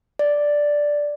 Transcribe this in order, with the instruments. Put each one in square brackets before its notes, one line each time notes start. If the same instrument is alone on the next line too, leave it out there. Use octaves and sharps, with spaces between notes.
[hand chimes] D5